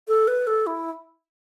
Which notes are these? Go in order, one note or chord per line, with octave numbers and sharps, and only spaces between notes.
A4
B4
A4
E4